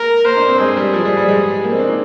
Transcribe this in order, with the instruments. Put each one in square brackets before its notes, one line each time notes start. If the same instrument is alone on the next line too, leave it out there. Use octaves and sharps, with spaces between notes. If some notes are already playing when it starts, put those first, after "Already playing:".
Already playing: [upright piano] G#3 A#3 [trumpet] A#4
[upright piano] A#3 [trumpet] C5
[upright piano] D4
C4
[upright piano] G#3 [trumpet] G#4
[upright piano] G3
F3
G3
G3
G#3
A#3
C4
D4
D#4